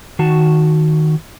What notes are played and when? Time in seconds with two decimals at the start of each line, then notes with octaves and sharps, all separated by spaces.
0.19 D#3 F#4 A5